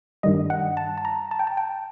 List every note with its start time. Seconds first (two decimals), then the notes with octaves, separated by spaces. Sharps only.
0.23 G2 D#3 G3 D#5
0.50 F#5
0.77 A5
0.98 A5
1.05 A#5
1.31 A5
1.39 G5
1.47 A5
1.57 G5